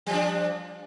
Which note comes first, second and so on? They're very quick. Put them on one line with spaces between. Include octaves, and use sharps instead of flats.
G3 F3 D4